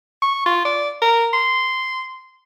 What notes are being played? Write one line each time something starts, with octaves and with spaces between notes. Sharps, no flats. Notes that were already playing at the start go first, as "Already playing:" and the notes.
C#6
F4
D5
A#4
C6